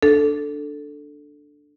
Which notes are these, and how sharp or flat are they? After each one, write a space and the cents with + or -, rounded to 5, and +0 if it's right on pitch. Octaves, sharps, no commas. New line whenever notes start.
D4 +0 A4 +0